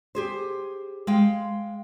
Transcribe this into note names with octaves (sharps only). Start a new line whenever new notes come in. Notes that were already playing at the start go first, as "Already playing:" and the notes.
G4 G#4 C5
G#3 F5 G5